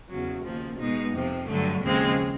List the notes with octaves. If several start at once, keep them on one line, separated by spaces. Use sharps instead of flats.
E2 C#3 F#3
D#2 C#3 F3 A#3
B2 G#3 B3 D#4
F2 C3 F3
G2 D3 F#3 A3
D#2 C#3 F3 G#3 C4